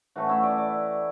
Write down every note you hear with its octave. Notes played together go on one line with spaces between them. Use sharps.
A2 E3 A3 C#4 F#4
E4
D5
D5